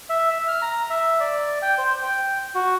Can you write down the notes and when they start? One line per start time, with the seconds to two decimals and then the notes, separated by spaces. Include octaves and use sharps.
0.09 E5
0.30 E5
0.48 F6
0.62 A#5
0.90 E5
1.20 D5
1.62 G5
1.78 C5
2.02 G5
2.55 F#4